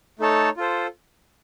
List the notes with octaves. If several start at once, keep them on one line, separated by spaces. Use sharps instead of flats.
A3 D#4 A4 C#5 A5
F4 A4 C5